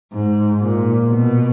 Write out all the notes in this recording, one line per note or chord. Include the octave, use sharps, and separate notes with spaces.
G#2
A#2
B2